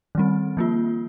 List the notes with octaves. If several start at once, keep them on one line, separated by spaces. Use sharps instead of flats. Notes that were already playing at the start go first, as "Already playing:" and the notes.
D#3 G3 C4
F3 A#3 F4